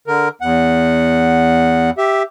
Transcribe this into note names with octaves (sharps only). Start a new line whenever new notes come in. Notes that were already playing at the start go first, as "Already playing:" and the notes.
D3 A#4
E2 F#5
G4 E5